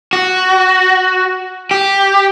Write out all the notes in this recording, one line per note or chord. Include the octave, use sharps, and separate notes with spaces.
F#4
G4